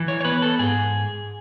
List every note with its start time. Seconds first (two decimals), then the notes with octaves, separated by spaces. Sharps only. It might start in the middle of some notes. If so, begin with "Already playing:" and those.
Already playing: E3
0.08 C#5
0.21 C#5
0.25 B3 B4
0.42 A4
0.59 G#2 G#4